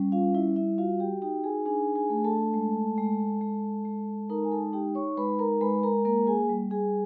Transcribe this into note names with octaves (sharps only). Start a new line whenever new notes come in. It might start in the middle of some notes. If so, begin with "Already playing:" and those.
Already playing: G3 C#4
F4 F5
G3 E4 E5
E4 E5
F4 F#4 F5
G4 G5
D#4 G4 G5
G#4 G#5
D4 G#4 G#5
G#4 G#5
A3
A4 A5
G#3
G#3
G#3
G#3
D#4 A#4 A#5
G#5
A4 A5
D#4 G4 G5
C#5 C#6
G#3 B4 B5
A#4 A#5
G#3 B4 B5
A#4 A#5
A#3 A#4 A#5
G#4 G#5
G3
G#4 G#5